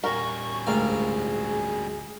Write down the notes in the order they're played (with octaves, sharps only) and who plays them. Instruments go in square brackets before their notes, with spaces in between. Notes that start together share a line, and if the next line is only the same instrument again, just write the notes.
[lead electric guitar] G3 C#4 [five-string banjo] F#4 A#4 [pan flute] C#6
[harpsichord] D2 G#2 F5 [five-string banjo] A#3 C4 F4 [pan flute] G#4